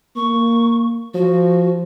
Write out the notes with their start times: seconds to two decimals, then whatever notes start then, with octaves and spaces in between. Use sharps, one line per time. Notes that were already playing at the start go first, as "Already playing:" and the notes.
0.16 A#3 C#6
1.14 F3 F#4